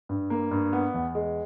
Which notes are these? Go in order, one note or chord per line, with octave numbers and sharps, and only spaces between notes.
G2
A#3
G2
B3
E2
G#3